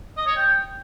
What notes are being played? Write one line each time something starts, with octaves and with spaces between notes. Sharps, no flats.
D#5
C#5
G5